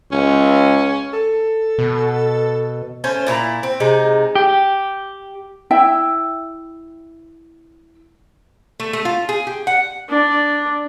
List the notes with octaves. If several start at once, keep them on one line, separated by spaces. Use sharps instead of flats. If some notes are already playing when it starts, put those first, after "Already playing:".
C#2 C#4
A4
B2
A3 C#4 C5
A#2 E4 F4 A#5
C4
C3 G#3 D#4
G4
E4 E5 G5
A3
A3
F4
G#4
G4
F#5
D4